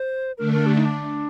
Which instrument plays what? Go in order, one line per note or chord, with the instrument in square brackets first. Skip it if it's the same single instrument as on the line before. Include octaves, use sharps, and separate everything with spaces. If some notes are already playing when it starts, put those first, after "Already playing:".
Already playing: [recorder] C5
[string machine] D3 A3 D4 [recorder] A#4
[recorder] A#4
G4
D#4
D4